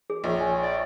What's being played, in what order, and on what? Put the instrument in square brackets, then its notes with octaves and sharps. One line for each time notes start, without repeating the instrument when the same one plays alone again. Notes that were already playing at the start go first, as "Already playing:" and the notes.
[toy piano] G#4
[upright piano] A#1 [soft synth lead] C#5
[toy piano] G#5
[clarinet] D5